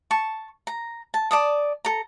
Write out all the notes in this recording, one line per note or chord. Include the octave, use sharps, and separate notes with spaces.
A5 C#6
A#5
A5
D5 A5 D#6
A4 A#5